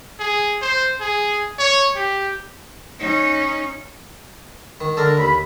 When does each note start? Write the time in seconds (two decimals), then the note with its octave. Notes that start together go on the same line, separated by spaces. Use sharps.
0.19 G#4
0.62 C5
1.01 G#4
1.58 C#5
1.96 G4
2.99 C#4 D#4
4.81 D#3
4.97 D3 D4 A4 A#4
5.17 D#2 B5